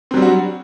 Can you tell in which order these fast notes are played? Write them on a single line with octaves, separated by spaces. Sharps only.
C4 F#3 G3 D4 F#4